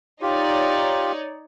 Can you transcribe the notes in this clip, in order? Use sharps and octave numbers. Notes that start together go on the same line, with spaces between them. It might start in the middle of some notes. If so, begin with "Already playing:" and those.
D#4 F4 G4 C#5 D5